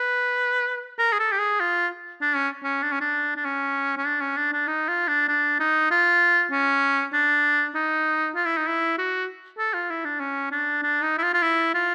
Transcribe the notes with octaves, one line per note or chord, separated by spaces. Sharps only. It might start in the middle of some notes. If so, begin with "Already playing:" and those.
Already playing: B4
A#4
G#4
A4
G4
G#4
F4
D4
C#4
C#4
D4
C#4
D4
D4
C#4
C#4
D4
C#4
D4
D4
D#4
F4
D4
D4
D#4
F4
C#4
D4
D#4
F4
E4
D#4
E4
F#4
A4
F4
E4
D4
C#4
D4
D4
D#4
E4
F4
F4
E4
F4